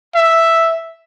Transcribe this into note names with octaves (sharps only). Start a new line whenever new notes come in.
E5